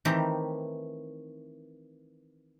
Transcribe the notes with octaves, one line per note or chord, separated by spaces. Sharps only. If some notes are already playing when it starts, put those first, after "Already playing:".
D#3 E3 A3 C4 G4 A#5